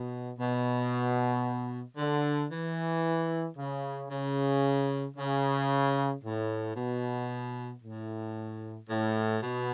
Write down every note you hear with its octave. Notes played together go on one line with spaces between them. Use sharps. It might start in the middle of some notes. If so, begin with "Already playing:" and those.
Already playing: B2
B2
D3
E3
C#3
C#3
C#3
A2
B2
A2
A2
B2